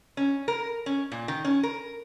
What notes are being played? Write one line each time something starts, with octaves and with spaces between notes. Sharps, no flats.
C#4
A#4
C#4
A#2
D#3
C#4
A#4